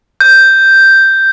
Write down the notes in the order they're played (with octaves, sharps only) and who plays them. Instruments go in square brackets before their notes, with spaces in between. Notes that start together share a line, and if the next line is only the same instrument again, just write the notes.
[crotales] G6